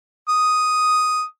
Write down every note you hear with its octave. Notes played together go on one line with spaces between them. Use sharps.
D#6